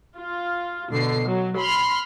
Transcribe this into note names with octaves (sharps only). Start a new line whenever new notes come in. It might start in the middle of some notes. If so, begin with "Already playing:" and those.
F4
B2 D3 C7
F#3
B5 C6 F6